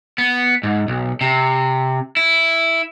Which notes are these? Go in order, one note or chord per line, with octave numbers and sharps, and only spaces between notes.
B3
G#2
B1
C3
E4